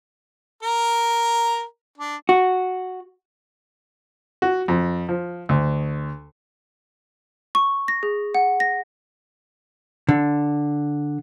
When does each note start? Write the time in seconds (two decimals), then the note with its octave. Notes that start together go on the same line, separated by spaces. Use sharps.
0.63 A#4 A#5
1.98 D4
2.29 F#4
4.42 F#4
4.68 F2
5.09 F3
5.49 D2
7.55 C#6
7.88 A#6
8.03 G#4
8.35 F#5
8.60 A#6
10.09 D3